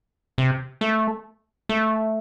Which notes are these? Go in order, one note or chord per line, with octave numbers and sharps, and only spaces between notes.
C3
A3
A3